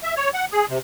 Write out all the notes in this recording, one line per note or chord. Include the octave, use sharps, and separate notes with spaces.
E5
C#5
F#5
G#4
C3